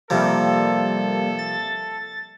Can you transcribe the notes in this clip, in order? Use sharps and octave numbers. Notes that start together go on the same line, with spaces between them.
C3 F3 G3 A#3 A4
A6